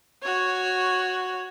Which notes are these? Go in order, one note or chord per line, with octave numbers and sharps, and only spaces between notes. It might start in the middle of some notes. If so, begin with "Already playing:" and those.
F#4 C#5